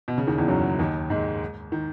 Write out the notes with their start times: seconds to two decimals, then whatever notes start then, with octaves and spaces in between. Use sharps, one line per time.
0.08 B2
0.18 C#3
0.27 D#2 D#3
0.38 E2 E3
0.48 F#2 F#3
0.79 D#2 D#3
1.10 G#2 G#3
1.72 D#3